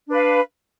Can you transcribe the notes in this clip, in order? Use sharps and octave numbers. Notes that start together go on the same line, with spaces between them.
D4 B4 F5